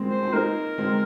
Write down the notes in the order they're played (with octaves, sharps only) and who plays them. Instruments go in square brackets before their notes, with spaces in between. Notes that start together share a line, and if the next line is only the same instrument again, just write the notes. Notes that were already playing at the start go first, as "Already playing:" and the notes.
Already playing: [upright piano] G#3 A#3 C4
[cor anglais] C5
[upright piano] C4
[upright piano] A#3 D#4 [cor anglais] A#4
[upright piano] G#3 C4